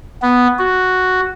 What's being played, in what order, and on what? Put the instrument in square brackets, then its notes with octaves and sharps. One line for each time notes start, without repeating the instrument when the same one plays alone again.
[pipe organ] B3
F#4